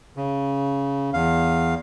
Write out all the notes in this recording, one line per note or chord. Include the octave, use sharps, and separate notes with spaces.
C#3
E2 F5